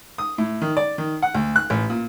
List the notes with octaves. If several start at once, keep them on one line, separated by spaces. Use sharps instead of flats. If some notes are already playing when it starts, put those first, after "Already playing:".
D#6
A2
D#3
D5
D#3
F#5
D2
F#6
A1
A#2